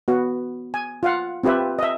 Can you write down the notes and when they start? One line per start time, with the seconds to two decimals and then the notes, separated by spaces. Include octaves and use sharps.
0.08 B3 F#4
0.74 G#5
1.03 F4 F5 F#5
1.44 C4 F4 G4 B4 E5
1.79 D#5 E5